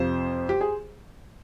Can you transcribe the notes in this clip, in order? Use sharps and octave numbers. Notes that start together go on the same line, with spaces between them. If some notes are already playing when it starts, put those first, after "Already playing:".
Already playing: F2 C3 F3 C5
G4
G#4